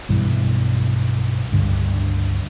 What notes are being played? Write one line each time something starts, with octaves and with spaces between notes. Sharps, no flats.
B1 G2 E3 G3
C#2 G2 D3